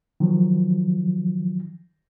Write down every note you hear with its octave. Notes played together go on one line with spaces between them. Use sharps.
D#3 F3 F#3